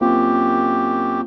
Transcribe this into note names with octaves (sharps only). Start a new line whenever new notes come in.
F#2 A#3 C4 F4 G4